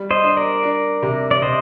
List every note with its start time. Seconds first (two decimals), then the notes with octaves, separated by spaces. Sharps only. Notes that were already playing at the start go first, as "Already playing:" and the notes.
Already playing: G3
0.11 C5 D#5
0.24 D4
0.37 A#4 D5
0.63 D4
1.03 C3
1.31 D5
1.42 C3 C5 D#5